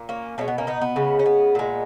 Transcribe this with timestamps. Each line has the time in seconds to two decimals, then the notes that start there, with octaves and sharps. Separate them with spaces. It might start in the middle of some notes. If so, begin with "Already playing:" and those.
Already playing: A#2
0.09 A#3 C#4
0.38 B2 G#3 A#3 C#4
0.48 B3
0.58 A#3 C#4
0.67 B3 D#4
0.81 B3
0.96 C#3 G#3
1.19 C#4
1.26 B3
1.55 A#2 G#3